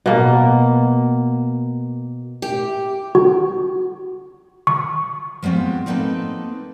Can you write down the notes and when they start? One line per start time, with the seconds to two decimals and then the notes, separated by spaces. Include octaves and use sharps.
0.06 B2 A#3
2.42 G4
3.15 F#4
4.67 C#6
5.43 F3 G#3 B3 C4 F4
5.86 A#3 C4 D#4 A4 B4